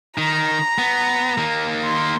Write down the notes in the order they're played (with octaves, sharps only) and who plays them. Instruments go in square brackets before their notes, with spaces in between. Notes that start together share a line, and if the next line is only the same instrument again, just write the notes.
[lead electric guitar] D#3 [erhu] A#5
[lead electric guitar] B3
D#3 A#3
[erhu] C6